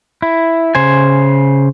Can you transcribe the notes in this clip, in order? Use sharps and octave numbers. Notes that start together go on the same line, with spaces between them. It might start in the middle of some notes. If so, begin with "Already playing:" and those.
E4
C#3 C5 G#5